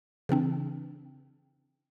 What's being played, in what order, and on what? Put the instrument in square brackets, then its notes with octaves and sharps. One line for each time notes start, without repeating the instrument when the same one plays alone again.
[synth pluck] C#3 E3 C4 D4